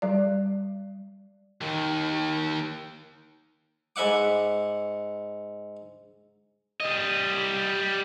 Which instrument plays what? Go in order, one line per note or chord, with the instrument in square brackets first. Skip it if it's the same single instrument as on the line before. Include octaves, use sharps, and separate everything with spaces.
[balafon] G3 D5
[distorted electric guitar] D#2 D#3
[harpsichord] G#2 B4 E5 F#5 D6
[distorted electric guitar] G3 D#5